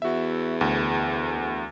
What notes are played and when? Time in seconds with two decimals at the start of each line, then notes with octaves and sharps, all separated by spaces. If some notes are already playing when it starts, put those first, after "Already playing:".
0.02 E2 F#4 E5
0.61 D2